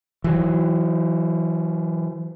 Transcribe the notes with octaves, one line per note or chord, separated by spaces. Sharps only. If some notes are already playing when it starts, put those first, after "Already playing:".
E3 F#3